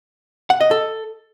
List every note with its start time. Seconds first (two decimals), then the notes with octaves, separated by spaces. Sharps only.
0.50 F#5
0.61 D#5
0.71 A4